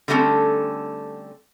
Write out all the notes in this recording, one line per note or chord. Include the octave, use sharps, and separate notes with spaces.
D3 G3 A3 C4 C#4 A4